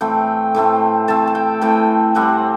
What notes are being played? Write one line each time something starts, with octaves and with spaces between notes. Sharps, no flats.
A2 E3 A3 C4 G5
A2 E3 A3 C4
A2 E3 A3 C4 A5
A5
G5
A2 E3 A3 C4 G5
A2 G3 C4 F#5